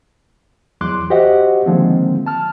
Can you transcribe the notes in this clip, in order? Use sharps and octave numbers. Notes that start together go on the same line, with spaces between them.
E2 F#3 C6 D6 F#6
F#4 G4 C5 D#5 E5 F#5
D3 D#3 F3 G#3 A#3 C4
A5 F6